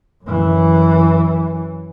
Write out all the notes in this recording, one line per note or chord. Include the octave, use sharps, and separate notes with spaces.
F#2 E3